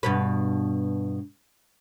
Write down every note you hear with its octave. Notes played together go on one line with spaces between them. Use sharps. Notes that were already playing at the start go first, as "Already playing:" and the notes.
G2 B2 B4